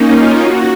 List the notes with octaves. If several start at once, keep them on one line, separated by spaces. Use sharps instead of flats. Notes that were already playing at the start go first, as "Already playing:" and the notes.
Already playing: A#3 C#4 D#4
F4
F#4